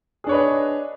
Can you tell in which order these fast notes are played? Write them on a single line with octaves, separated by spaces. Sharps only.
G#4 D4 C#5 B4 D#5